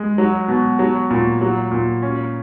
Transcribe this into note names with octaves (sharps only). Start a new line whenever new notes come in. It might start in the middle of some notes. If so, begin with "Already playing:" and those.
Already playing: G#3
F#3
B2
F#3
A#2
F#3
A#2
C#4